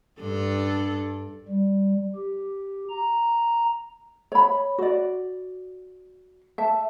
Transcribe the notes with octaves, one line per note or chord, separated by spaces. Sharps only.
G2 D4 A4
G3
G4
A#5
C#5 B5
F#4 D5
E5 A5